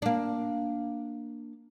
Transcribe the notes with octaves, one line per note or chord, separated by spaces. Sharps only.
A#3 D4